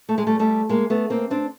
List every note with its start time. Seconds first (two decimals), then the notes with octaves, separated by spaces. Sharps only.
0.09 A3
0.18 G#3
0.27 G3 A3
0.39 G3 A3
0.69 G#3 A#3
0.90 A3 B3
1.10 A#3 C4
1.30 C4 D4